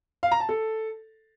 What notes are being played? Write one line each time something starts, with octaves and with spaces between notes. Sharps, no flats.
F5
A#5
A5
A4